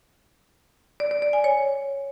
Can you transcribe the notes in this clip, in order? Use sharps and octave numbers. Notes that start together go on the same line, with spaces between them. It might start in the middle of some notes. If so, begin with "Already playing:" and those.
D5
D5
D5
G#5
C#5